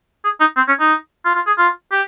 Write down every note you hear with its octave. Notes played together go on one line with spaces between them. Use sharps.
G#4
D#4
C4
C#4
D#4
F4
F4
G#4
F4
G4